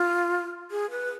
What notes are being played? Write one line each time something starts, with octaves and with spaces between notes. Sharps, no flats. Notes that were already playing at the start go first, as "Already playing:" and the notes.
Already playing: F4
G#4
B4